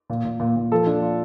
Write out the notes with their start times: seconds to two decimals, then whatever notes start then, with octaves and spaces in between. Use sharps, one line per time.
0.10 A#2
0.25 A#2
0.40 A#2
0.56 A#2
0.72 F3 A4
0.87 D4
1.02 F4